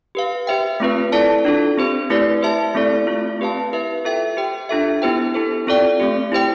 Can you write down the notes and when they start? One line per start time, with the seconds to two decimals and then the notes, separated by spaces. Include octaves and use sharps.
0.15 G4 B4 F5
0.47 G4 C5 E5 G5
0.80 A3 C4 F4 B4
1.12 E4 A4 D5 A5
1.45 D4 F4 A4
1.77 C4 G4 C5
2.10 A3 E4 G4 B4 D5
2.42 G4 C5 E5 A5
2.75 A3 C4 E4 A4 D5
3.07 A3 C4 F4
3.39 C4 G4 B4 F5 A5
3.72 E4 B4 E5
4.05 F4 A4 E5 G5
4.37 G4 C5 G5
4.69 D4 F4 A4 E5
5.02 B3 E4 G4 C5 G5
5.34 E4 A4 C5
5.67 C4 F4 A4 D5 G5
6.00 A3 C4 G4
6.32 E4 G4 C5 G5